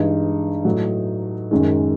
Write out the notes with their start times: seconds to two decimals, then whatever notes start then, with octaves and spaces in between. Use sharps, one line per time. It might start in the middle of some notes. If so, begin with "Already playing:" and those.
Already playing: G2 E3 G#3 D#4
0.65 A2 F#3
1.51 F#2 D#3 G#3